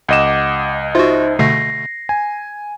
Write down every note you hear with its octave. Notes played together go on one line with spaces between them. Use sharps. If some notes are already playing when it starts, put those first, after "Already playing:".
C#2 D#5 F#5 D6 E7
D#4 F4 F#4 C5 E5
B2 D3 A3 A#6 C7
G#5